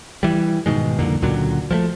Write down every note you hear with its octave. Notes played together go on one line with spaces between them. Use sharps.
E3 G3
G#2 B2 D#3 G#3
C2 F2 D3 A#3
C#2 A#2 D3 F#3
F3 G3 A3